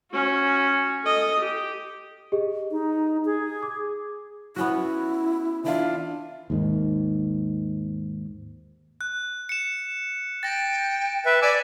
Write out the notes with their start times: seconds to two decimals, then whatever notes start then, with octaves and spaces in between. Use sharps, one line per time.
0.11 C#4 F#4
1.04 A4 D#5
1.39 G4
2.32 G4 G#4 D#5
2.71 D#4
3.25 G#4
3.63 D6
4.56 B3 C#4 E4 F#4
5.64 E3 D4 F4 E5
6.50 D#2 G#2 D#3
9.01 F#6
9.49 C#7 E7
10.43 G5 A6 A#6
11.26 B4 E5
11.42 D5 G#5 D6 E6